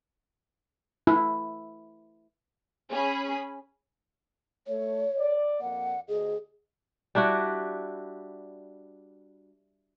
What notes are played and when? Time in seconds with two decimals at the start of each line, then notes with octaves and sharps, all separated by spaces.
1.07 E4
2.90 C#4 G#4 B5
4.68 A3 C#5
5.18 D5
5.61 F2 A#3 D5 F#5
6.08 D2 G#4 D#5
7.15 G3 D4 E4 F#4